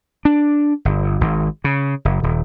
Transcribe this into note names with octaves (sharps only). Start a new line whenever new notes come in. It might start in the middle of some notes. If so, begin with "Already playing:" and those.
D4
G1
G#1
C#3
F#1
D#1